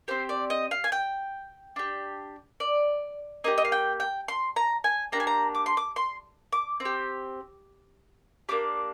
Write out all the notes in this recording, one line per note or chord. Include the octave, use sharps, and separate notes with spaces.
C4 G4 C5
D5
D#5
F5
G#5
G5
D4 G4
D5
A#3 D4 G4 D#5
D#5
F5
G5
G5
C6
A#5
G#5
A#3 D4 G4 A#5
G#5
A#5
D6
C6
D6
C6
D6
C4
G4
A#3 D4 G4 D6